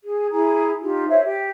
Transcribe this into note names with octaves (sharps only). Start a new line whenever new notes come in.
G#4
E4 G#4 A#5
D#4 F4 G4
C5 C#5 E5
G4